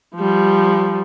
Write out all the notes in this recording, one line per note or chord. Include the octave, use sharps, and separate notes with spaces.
F3 G3